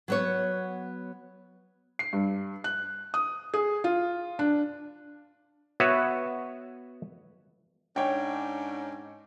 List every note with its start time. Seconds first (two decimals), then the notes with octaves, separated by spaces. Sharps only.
0.08 F#3 B3 C#5
1.99 C7
2.13 G2
2.64 F#6
3.14 D#6
3.54 G#4
3.84 F4
4.39 D4
5.80 B3 F#4 B4 C#5 E5
7.96 G#2 C#4 D4 C#5 G5